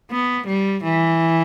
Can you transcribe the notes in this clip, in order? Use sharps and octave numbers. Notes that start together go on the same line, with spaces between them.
B3
G3
E3